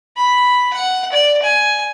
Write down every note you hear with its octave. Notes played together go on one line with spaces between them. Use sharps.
B5
F#5
D5
G#5